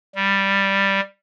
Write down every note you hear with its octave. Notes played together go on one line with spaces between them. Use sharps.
G3